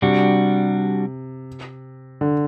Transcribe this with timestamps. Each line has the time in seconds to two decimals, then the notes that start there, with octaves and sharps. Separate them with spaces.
0.02 C3 G3 D4 F#4
2.21 D3